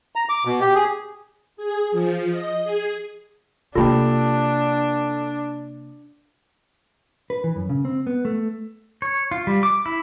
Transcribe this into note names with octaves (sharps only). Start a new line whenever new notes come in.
A#5
D6
B2
G4
G#4
G#4
F3
D#5
G#4
C3 A#3 D4 F4 G4 A4 G5 B5
B4
E3
F#2
C#3
C4
B3
A3
C#5
F4
G3
D6
E4